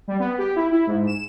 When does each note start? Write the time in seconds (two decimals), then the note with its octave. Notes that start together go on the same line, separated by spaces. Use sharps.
0.08 G3
0.19 B3
0.38 G4
0.56 E4
0.72 E4
0.87 G#2
1.07 E7